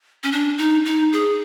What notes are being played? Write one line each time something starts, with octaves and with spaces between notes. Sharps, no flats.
C#4
D4
D#4
D#4
G#4